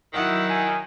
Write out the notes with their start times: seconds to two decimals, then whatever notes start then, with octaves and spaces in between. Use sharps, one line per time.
0.14 D#3 F#3 E4 F#5
0.50 G#5